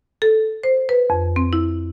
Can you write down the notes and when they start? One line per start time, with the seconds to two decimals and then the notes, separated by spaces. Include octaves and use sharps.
0.22 A4
0.64 C5
0.89 B4
1.10 F2
1.36 C4
1.53 E4